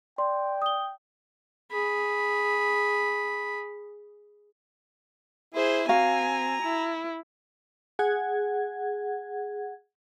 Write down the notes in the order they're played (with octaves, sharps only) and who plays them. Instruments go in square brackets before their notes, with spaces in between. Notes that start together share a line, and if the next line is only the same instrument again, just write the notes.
[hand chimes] D5 [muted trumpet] G5 [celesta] C6
[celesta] D#6 G7
[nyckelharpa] G#4 B5
[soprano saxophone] E4 [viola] G#4 C5
[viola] C4 G#5 [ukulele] F#4 F5 [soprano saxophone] A#5
[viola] E4
[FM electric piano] G#4 F#5 G#6